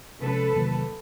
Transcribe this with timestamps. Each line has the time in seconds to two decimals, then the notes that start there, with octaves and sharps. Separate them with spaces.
0.22 C3 F3 G#3 C#4 A4 B4
0.55 E2 C3 D#3 F#3 A#3